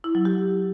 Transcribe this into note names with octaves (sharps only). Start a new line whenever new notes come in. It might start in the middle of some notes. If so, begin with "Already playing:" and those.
E4
F#3
G4